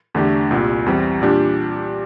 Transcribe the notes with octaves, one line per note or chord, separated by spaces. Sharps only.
E2 D3 A3 D4 G4
C2 A#2 G3
E2 E3 G3 C4
A#2 G3 D4 G4